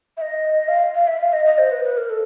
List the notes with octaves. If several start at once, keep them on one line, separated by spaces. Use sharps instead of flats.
E5
D#5
F5
F5
E5
F5
D#5
D#5
C5
B4
B4
A#4
A4